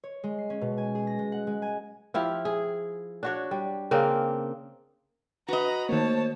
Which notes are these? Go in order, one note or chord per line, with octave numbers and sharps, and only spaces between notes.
C#5
G#3
C7
C#4
B2
G#5
G#4
A#6
G#3
F#5
G#3
G#5
F3 E4 G4 F5
G#4
D4 F#4 C#5
G3
C#3 A#3 C4 D4
F#4 B4 D#5 A#5 B5
D#3 A3 A#3 C5 C#5 A5